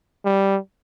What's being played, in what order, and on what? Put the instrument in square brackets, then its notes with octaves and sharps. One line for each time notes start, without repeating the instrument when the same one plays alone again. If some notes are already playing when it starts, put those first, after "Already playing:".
[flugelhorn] G3